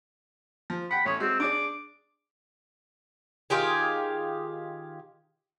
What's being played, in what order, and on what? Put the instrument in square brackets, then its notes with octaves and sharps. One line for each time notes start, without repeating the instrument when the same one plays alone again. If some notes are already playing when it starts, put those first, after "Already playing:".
[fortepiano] F3
[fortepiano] F#5 G5 [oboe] B5
[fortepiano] A1 D#6 [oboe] C#5
[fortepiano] G#3 F#4 [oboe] C4
[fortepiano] D4 G#4 D5 [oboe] D6
[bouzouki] D#3 F4 G4 G#4